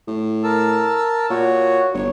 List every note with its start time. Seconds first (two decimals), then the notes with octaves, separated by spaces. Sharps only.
0.08 A2
0.44 A#4 A5 E6
1.30 A#2 F#4 C#5
1.94 G1 C#5